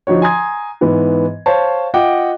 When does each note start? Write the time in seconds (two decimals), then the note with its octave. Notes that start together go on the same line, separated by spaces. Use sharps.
0.07 D3 F3 D#4 F#4 C#5
0.22 G#5 A#5 C6 D#6 G#6
0.81 G#2 E3 B3
1.46 C5 C#5 F5 A5
1.94 F4 D#5 F#5 G5 D6